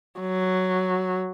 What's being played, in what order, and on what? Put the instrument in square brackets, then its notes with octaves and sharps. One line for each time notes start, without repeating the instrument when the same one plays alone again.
[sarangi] F#3